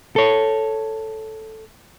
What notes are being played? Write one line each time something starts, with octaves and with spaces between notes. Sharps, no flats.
A4 C#5